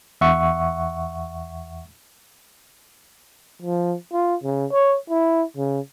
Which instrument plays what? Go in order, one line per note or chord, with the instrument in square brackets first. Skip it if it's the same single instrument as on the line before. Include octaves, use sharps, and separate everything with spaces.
[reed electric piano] E2 E5 F#5 C#6
[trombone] F3
F4
C#3
C#5
E4
C#3